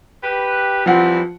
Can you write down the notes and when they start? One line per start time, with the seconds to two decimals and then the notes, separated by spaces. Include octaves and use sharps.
0.23 G4 B4
0.86 E3 F3 G3 C4 F#5